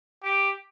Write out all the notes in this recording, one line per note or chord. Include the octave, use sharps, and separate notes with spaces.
G4